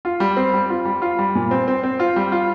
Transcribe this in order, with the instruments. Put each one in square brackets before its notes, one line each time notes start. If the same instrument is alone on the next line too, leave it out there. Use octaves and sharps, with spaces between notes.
[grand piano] F4
G3
C4
G3
F4
G3
F4
G3
A#2
C4
C4
C4
F4
G3
F4